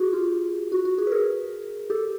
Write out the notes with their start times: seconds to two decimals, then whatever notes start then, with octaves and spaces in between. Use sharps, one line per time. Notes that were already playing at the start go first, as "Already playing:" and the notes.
Already playing: F#4 G#4
0.13 F4 G4
0.72 F#4
0.85 F#4
0.98 F#4 G#4
1.07 B4
1.11 G#4 A#4
1.90 G4 A4